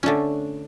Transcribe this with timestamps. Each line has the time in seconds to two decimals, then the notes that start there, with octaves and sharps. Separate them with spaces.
0.03 D3 A3 C#4 D4